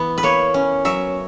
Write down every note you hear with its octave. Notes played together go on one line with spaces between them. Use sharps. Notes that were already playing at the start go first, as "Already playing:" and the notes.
Already playing: E3 B3
B4
A#3 C#5
C#4
F#3 E5